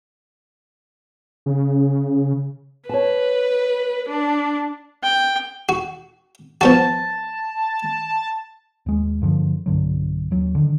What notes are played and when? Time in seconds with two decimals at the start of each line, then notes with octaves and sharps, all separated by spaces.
1.46 C#3
2.89 B4 C#5 A5
4.09 D4
5.03 G5
5.69 F#4
6.61 F3 B3 F#4 A5
8.86 D#2 G#3
9.22 G2 D3 D#3 F3
9.66 B1 G2 D3 F#3
10.31 D#2 F#3
10.55 D3 D#3